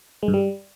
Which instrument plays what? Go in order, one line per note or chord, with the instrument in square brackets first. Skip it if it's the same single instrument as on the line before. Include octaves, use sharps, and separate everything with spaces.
[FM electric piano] G#3
G2
G3